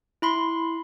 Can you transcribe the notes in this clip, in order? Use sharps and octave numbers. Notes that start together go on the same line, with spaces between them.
E4 B5 C6